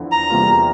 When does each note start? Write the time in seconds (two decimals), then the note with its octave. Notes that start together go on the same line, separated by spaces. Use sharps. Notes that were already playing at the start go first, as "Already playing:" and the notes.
Already playing: E2 D3 F3 E4
0.12 A#5
0.30 E2 C3 G3 A#3 F4